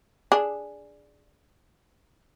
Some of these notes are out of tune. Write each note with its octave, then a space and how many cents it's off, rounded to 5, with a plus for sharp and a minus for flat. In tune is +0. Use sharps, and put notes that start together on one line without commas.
D4 +0 G#4 +0